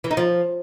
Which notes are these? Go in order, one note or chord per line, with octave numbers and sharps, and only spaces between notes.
E3
D#4
F3